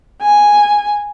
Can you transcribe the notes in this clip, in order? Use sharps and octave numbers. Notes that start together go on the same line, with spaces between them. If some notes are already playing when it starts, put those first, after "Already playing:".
G#5